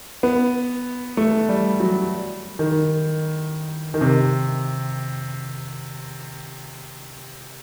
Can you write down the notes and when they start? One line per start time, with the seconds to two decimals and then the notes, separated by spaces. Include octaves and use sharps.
0.23 B3
1.17 A3
1.49 G3
1.80 F#3
2.59 D#3
3.94 D#3
4.01 C3